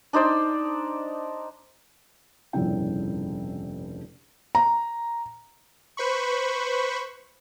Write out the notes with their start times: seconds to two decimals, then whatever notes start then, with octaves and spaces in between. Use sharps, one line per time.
0.13 D4 D#4 C5 D5
2.53 F1 A#1 G2 C#3 E4 G5
4.55 A#5
5.97 B4 C5 B5 C#6